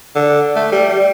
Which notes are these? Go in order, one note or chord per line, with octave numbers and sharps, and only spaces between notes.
D3
A3
G3
G3